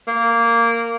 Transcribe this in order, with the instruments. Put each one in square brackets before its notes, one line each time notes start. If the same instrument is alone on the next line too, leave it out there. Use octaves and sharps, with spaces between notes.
[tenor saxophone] A#3